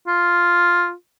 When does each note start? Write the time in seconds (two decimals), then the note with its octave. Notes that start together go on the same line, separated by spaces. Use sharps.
0.07 F4